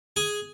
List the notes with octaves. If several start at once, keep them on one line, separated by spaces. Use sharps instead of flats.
G#4